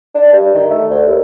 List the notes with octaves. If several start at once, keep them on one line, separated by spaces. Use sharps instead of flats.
D4
G2
D#3
A3
D2
D#2